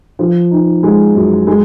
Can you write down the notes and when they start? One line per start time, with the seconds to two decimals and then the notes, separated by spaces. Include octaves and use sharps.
0.19 F3
0.51 D#4
0.83 G#3
1.15 F#2
1.47 G#3